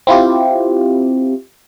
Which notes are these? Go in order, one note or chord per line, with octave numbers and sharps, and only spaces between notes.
C4 E4 F4 G4